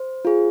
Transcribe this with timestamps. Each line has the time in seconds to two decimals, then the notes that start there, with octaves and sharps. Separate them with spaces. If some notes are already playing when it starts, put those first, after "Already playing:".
Already playing: C5
0.25 F4 G#4